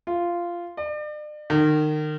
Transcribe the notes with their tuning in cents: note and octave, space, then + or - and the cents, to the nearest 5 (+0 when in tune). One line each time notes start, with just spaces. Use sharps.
F4 -10
D5 +40
D#3 -30